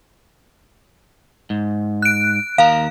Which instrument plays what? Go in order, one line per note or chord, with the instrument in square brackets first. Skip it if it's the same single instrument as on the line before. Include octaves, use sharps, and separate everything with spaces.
[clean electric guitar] G#2
[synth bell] F#6 D7
[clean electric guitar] D#2 A#4 A#5 [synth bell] F5